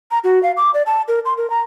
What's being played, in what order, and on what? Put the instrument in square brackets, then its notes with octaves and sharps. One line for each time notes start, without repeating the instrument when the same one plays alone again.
[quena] A#5
F#4
F5
D6
D5
A5
A#4
C6
A#4
A#5